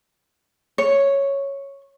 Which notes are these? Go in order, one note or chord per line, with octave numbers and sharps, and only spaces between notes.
C#5